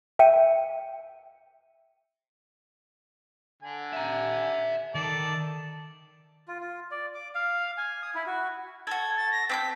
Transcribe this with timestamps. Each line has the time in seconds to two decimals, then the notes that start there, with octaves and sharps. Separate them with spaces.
0.19 E5 G5 C#7 D#7
3.63 D3 G#5
3.93 E5 A#5
4.95 D#3 A4 D5
6.48 F4
6.60 F4
6.91 D5
7.14 D6
7.35 F5
7.78 G#5
8.03 D#6
8.15 E4
8.26 F#4
8.87 F#4 A4 G#6
9.17 A6
9.32 A#6
9.50 C4 D6 G6 B6